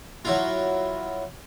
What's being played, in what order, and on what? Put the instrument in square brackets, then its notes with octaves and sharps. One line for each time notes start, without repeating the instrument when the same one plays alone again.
[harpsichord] F#3 E4 F4